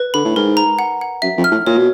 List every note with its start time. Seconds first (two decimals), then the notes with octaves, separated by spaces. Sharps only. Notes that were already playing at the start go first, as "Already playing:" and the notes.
Already playing: B4
0.14 D3 B5
0.25 A2
0.35 G#2 A#4
0.57 A#5
0.79 F#5
1.01 F#5
1.22 F#2 E5
1.38 F2
1.44 F6
1.51 A2
1.66 A#2 C#5
1.77 B2